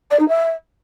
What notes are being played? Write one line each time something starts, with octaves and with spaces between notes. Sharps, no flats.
D5
D#4
E5